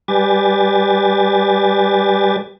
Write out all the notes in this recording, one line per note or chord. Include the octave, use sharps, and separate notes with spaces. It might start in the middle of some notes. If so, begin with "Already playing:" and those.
G3 G4 B4 D5 G#5 A6